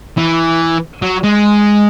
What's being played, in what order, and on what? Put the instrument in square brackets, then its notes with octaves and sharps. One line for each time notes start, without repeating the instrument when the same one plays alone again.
[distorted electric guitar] E3
F#3
G#3